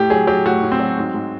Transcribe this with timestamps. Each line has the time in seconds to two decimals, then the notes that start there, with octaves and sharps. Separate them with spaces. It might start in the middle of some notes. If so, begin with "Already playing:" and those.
Already playing: A2 G4
0.10 F#3 G#4
0.27 F#3 G4
0.46 A2 F#4
0.63 A2
0.72 C4
0.80 F#3
0.98 G#2
1.14 G#2